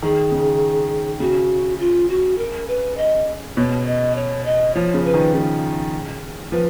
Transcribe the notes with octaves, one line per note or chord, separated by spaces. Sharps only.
D#3 G#4
C#3
C#3 F#4
F4
F#4
A#4
B4
D#5
B2 C#5
D#5
C#5
D#5
F3 C#5
C#3
B4
D#3
C#3
F3 B4